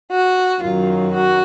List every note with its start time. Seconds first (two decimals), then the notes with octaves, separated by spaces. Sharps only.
0.11 F#4
0.62 F#2 D#3 F#3 F4
1.13 F#4